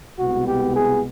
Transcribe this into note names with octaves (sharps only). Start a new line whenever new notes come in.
C2 B2 G#3 B3 F#4
G4
G#4